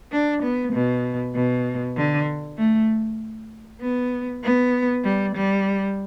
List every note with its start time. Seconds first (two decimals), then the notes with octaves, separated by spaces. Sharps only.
0.12 D4
0.43 B3
0.73 B2
1.35 B2
1.97 D3
2.58 A3
3.81 B3
4.44 B3
5.04 G3
5.36 G3